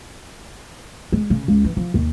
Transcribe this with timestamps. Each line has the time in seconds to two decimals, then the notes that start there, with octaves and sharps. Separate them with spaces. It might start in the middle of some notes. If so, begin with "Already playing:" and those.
1.12 G#3
1.30 C#3
1.48 C#2
1.64 E3
1.77 F3
1.94 D#2